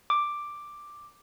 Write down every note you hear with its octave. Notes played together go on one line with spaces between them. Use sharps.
D6